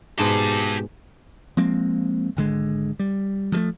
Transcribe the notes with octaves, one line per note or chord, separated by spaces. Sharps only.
G#2 B2 G4 A5
F3 G#3 A#3 C4
G#1 D3 G#3
G3
F3 F#3 A3